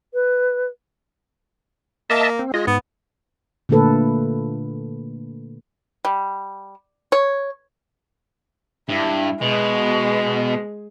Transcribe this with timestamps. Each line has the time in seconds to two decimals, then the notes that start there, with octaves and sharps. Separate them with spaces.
0.14 B4
2.10 A#3 D#5 E5 A5
2.39 C4
2.54 G#3 F4 D#5
2.67 G#2 B3
3.69 A#2 D3 A3 A#3 A4 B4
6.05 G3
7.12 C#5
8.89 G2 E4
9.42 B2 G#3